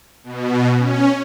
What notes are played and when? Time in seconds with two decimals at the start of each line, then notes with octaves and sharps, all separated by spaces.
0.24 B2
0.77 C#4